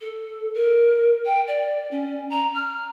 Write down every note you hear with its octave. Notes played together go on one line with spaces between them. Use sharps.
A4
A#4
G5
D5
C#4
A#5
F6